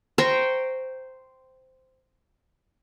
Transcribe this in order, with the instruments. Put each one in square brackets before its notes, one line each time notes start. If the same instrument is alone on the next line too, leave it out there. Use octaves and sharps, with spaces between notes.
[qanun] C5 G5 A#5 C#6